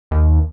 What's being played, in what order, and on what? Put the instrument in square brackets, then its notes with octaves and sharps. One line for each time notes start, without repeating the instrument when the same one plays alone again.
[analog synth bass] D#2